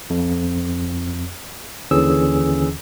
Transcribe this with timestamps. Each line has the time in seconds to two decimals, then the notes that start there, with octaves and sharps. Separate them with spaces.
0.10 F2
1.91 D#2 D3 E3 C#4 G#4 E6